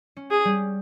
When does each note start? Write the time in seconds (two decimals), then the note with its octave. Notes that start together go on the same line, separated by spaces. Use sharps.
0.17 C#4
0.31 G#4
0.45 G3